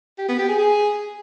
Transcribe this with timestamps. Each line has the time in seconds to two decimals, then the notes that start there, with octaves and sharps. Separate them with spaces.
0.18 G4
0.28 B3
0.38 G4
0.48 G#4
0.58 G#4